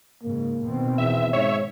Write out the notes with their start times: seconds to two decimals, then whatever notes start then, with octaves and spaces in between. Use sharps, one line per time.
0.23 G#2 C#3 A#3
0.64 B2 D#3 C4
0.98 E2 E5
1.33 G#2 C#5 E5